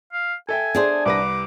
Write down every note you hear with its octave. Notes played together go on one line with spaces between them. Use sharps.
F5
A4 E5 G5 G#5
D4 G#4 C5
C2 B4 D6 A#6